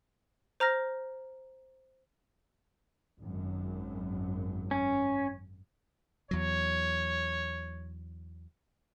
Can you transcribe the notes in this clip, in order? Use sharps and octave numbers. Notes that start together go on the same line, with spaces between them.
C5 A#5 F6 A#6
G#1 F#2
C#4
E2 F#3 C#5